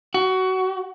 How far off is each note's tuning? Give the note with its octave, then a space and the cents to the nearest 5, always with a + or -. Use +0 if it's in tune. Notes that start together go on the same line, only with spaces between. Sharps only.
F#4 +20